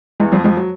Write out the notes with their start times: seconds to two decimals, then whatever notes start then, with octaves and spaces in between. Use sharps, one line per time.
0.20 E2 E3 G#3
0.32 F2 F3 G3
0.44 F2 F3 G#3
0.57 F#3